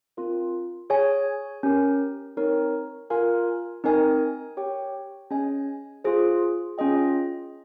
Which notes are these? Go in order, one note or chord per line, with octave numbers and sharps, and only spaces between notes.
C4 F4 A#4
G#4 C#5 G#5
C#4 G4 A#4
C4 D#4 A#4 C#5
F4 A#4 F5 G#5
C4 D#4 A#4 D#5 G#5
G4 C#5 G5
C#4 G#4 D#5 G#5
F4 G#4 C5
C#4 F4 G#4 D#5 G5